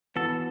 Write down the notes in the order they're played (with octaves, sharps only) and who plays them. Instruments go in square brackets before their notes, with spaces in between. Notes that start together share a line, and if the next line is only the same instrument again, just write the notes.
[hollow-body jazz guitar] E3 B3 F#4 [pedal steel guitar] A4